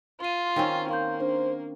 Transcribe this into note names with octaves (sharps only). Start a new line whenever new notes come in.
F4 C6 D#7
D#3 C4 C#4
A#3 F5 C6 G6
D4 C5